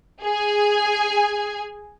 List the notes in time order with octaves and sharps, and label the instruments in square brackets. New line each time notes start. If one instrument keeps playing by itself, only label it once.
[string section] G#4 G#5